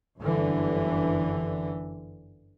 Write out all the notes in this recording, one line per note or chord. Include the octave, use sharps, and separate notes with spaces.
G1 F#2 D3 E3